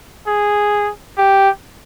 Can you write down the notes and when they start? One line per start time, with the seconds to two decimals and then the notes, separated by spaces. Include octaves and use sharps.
0.27 G#4
1.18 G4